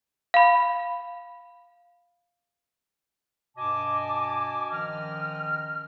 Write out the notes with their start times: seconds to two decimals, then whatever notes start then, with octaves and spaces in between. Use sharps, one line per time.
0.34 F5 B5
3.57 G2 B2 D#5 G#5 A5 D6
4.71 D#3 F3 C#4 D#5 F6